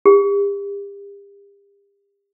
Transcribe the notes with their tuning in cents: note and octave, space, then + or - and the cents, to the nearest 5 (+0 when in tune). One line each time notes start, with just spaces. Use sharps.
G4 +40